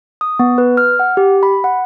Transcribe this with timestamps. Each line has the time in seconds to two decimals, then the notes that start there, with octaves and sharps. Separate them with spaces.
0.21 D#6
0.39 B3
0.58 B4
0.77 F6
0.99 F#5
1.17 G4
1.43 B5
1.64 F#5